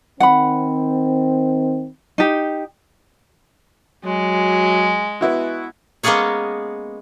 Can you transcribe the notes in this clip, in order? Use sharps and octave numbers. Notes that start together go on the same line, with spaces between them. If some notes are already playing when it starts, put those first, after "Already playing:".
D#3 C4 F#5 B5
D#4 G4
F#3 G#3
B3 E4 F#4
G#3 A#3 B3 C#4 G#4 C#5